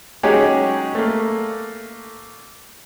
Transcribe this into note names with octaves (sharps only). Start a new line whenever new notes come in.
F#3 G#3 C#4 D#4 G4 G#4
A3 A#3